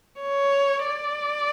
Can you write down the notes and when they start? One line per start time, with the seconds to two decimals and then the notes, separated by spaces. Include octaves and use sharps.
0.21 C#5
0.85 D5